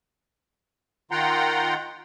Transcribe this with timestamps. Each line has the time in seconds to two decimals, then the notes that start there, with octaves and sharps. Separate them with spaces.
1.11 D#3 F4 F#5 G5 A#5 C6